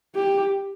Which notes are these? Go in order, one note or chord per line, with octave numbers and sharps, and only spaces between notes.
G4